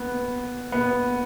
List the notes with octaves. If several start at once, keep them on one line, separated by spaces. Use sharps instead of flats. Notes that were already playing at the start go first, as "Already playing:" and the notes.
Already playing: B3
B3